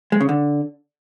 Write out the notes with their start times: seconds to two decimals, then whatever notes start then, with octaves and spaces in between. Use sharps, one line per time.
0.12 G#3
0.20 C#3
0.29 D3